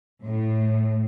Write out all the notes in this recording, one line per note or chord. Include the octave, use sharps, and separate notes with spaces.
A2